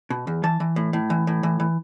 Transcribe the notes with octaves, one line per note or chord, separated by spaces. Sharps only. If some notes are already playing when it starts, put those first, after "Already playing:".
B2
E2
E3 A5
E3
A2
A2
E3
A2
E3
E3